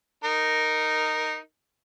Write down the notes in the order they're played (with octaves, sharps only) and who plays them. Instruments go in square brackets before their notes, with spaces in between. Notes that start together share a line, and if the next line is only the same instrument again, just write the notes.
[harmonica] D#4 A#4